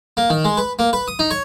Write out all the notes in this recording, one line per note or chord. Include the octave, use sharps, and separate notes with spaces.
A#3
D#3
G#3
B4
A#3
B4
D#6
D#4
C#5